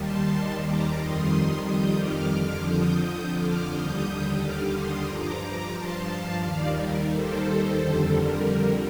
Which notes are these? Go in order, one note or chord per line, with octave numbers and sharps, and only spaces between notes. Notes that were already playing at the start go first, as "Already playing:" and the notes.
Already playing: D#2 D#3 G3 A5 C6
A#5 D6
F2 D#3 G3 C6 D#6
D#6 G6
D6 F6
F2 D3 F3 D6 F6
D#6 G6
D#6 G6
D6 F6
D#2 D3 G3 D#6 G6
D6 F6
C6 D#6
G2 F3 A#5 D6
A#5 D6
A5 C6
F5 A5
D#2 D#3 G3 D5 F5
A#4
A4 C5
F2 D3 G3
A#4
A#4